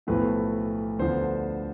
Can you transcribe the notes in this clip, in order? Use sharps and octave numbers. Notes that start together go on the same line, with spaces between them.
B1 A2 F3 A3 E4 B4
D2 D3 F3 B3 C5